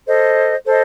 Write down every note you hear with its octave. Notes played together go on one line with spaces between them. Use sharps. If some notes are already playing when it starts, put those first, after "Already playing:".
A4 C5 D#5
A4 C5 D#5